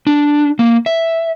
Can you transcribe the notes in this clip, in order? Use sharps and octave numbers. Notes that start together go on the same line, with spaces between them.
D4
A#3
E5